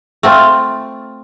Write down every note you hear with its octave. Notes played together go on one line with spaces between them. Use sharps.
A3 C4 F4